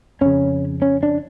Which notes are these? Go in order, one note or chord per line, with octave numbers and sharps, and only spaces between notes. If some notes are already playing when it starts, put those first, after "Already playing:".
F2 C#3 C#4
C#4
D4